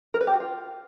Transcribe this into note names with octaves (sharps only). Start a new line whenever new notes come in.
A#4
B4
G4
F#4
F4